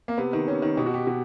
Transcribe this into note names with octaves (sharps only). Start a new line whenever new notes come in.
A#3
C3 B3
D#3
C3 C#4
D#3
B2 G4
F#4
G4
B2 F#4